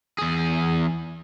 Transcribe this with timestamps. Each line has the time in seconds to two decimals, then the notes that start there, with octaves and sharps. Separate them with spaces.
0.18 E2 G#4